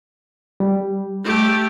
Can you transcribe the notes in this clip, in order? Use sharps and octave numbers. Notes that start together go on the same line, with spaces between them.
G3
A3 G4